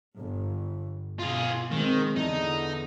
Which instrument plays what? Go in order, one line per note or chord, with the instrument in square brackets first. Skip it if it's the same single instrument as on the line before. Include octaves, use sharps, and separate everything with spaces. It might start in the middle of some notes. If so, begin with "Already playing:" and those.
[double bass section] G1
[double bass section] B2 [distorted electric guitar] F4 G#4
[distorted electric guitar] D#3 [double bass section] G#3 C4
[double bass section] E2 D3 [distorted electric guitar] D#4